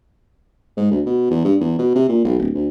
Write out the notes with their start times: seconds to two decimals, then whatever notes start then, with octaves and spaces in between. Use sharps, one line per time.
0.77 G#2
0.91 D2
1.06 B2
1.30 E2
1.45 G2
1.60 E2
1.79 B2
1.95 C3
2.09 A#2
2.24 B1
2.38 D1
2.54 D2